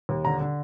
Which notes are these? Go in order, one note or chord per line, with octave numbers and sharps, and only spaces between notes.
D#2
D3 A#5
D3